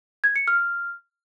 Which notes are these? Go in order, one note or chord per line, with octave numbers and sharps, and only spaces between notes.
G#6
C#7
F6